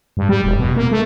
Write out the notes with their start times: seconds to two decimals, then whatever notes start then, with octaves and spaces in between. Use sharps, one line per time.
0.17 G2
0.29 G3
0.44 E1
0.59 B2
0.76 A#3
0.91 A3